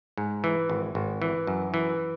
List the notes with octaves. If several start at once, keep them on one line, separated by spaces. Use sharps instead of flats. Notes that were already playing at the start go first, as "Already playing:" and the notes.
G#2
E3
G#1
G#1
E3
F#2
E3